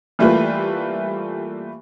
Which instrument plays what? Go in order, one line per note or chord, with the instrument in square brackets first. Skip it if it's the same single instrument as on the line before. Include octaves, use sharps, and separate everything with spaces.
[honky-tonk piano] E3 G3 A3 A#3 F4 B4